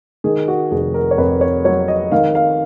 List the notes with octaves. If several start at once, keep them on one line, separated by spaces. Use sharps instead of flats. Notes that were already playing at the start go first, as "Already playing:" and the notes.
D#3 G#4
F#4
F1 G#4
A#4
C#5
F2 B4
C#5
F#3 C#5
D#5
D#3 F5
F5